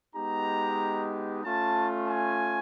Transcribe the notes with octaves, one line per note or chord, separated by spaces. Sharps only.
G#3 B3 D#4 G4 A#5
A3 C#4 F4 A5
G#5